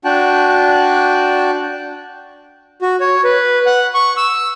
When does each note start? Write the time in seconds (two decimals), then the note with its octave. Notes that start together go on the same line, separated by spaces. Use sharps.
0.05 D4 F#4 G5 A5 F#6
2.82 F#4
3.00 C#5
3.24 B4
3.66 F#5
3.95 C#6
4.17 E6